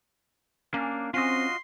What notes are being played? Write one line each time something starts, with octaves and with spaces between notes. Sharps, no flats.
A#3 C#4 D4
C4 C#4 F4 F#4 D#5 C6